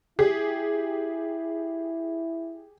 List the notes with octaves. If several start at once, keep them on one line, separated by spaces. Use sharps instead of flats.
E4 G4 G#4